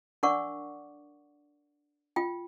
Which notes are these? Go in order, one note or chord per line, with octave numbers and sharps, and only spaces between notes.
D4 A#4 D5 F#5 C#6 D6
F4 G5